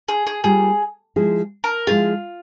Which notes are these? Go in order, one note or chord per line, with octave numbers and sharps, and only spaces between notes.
G#4
G#4
G3 A#3 F4 G#4
F3 G#3 E4 G#4
A#4
F3 G#3 E4 F4 G#4